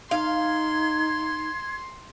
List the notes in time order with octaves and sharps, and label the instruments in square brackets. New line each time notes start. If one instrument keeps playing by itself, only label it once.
[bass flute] D#4 [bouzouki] F5 [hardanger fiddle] C6 [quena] G#6